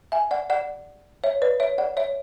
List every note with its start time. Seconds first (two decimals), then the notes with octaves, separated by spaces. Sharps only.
0.12 E5 G#5
0.31 D5 F#5
0.50 D5 F#5
1.24 C#5 E5
1.42 B4 D5
1.60 C#5 E5
1.78 D5 F#5
1.97 C#5 E5